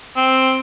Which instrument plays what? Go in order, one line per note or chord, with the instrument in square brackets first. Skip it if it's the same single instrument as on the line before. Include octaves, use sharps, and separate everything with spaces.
[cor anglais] C4